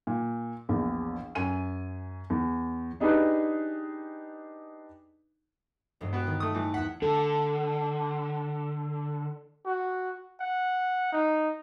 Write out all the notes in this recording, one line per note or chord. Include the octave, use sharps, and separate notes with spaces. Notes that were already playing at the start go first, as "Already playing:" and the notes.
A#2
A#1 E2
F#2 G#5 D#7
E2
D4 D#4 G4 G#4 B4
E1 G2 G#3
B3 F#4 G5
D#3
A3 D#6
A2 E3
E2 F#5 B6
D3 A4
F#4
F#5
D#4